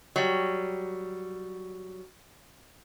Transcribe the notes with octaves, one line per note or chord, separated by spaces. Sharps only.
F#3 G3